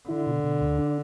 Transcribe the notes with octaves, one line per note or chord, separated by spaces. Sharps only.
D3 E4
B2
B2
D2
D4